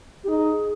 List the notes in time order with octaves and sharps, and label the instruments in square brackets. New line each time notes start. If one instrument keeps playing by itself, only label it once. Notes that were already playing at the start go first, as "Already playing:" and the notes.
[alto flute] G4
[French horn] D#4 [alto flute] G#4